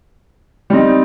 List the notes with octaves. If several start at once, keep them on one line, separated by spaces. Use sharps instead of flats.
G3 C4 D#4